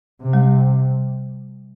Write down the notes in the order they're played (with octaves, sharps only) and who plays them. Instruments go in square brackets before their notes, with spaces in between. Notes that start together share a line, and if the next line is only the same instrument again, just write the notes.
[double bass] C3
[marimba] G3